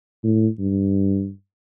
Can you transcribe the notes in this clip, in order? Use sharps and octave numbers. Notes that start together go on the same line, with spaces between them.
A2
G2